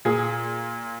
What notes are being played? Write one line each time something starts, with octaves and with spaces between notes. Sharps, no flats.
A#2 G#4